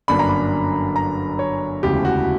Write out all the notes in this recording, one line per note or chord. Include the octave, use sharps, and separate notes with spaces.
G1 F#2 D3 A#3 D4 B5
A#5
B5
A#5
C#5
E1 D2 C#3 E3 G4
F#4